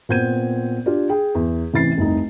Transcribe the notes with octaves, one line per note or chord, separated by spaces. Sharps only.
A#2 B3 C4 G6 G#6 D#7
D4 F4 G4
G#4 G5
E2
A1 C3 E3 A6 C7
F1 C2 D#4